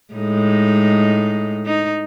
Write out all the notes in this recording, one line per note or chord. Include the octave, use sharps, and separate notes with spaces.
A2 G#3 D#4
D#4